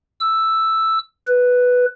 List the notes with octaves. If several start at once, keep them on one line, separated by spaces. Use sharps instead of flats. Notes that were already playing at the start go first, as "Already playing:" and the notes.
E6
B4